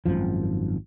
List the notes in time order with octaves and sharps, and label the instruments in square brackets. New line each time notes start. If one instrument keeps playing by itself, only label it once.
[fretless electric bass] G#1 C#2 F#2 F3